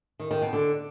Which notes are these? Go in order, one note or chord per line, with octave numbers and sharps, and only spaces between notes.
D#3
D#3
B2
D3